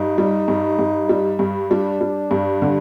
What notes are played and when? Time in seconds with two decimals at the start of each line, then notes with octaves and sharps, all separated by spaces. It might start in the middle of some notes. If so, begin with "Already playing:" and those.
Already playing: G2 D#4
0.18 G3
0.48 G2
0.79 G2
1.09 G3
1.39 G2
1.71 G3 D4
2.01 G3
2.31 G2
2.62 D3